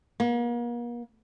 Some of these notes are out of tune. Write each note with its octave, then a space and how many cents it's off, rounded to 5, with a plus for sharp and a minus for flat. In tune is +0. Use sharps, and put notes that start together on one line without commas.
A#3 +40